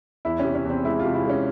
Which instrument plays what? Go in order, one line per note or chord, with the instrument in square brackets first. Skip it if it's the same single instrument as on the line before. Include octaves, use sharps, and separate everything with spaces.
[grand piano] E2 E4
C3 C#4
C#4
E2
C4
G#3 E4
C3 F4
E4
G#3
C#4